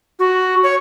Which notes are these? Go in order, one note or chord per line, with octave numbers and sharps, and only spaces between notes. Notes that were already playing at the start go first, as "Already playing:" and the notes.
F#4
C#5